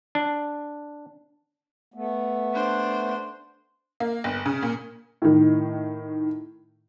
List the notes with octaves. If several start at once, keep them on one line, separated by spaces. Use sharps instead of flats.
D4
A3 B3
D4 C5
A#3
G1
C#3
A#2
A2 D#3